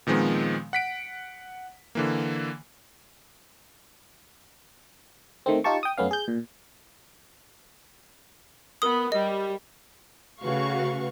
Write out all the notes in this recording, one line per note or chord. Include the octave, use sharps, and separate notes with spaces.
A#2 D#3 F3 G#3 B3 C4
F#5 B6 D7
D3 E3 A#3
D#3 A3 C4
D#4 F4 G4 A5 C#6
G5 D#6
F#2 A3 B3 C#4 F5
G#4 G6
A#2
B3 A#4 D#6
G3 D#5
C#3 A3 F#4 B4 F5 C#6